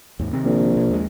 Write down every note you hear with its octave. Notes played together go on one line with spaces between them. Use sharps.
D#2 G#2
C3 D#3 C4
A#1
B2
D#2 G3 G#3